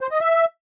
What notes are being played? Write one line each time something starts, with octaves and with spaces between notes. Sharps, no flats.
C5
D#5
E5